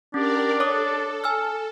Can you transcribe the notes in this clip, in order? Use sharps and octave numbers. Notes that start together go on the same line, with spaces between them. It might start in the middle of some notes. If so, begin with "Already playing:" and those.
C#4 D4 G4 A#4 D5
A4 C#5 D6 D#6
G#5 E6 F6